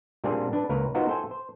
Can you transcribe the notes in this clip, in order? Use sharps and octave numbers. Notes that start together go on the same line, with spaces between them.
A#2 G3 A#3 C4 D4 G#4
D4 B4
C#2 A#3 A#4 B4 C#5
B3 D#4 F4 F#4 A#4 C5
A4 C5 G5 G#5
C5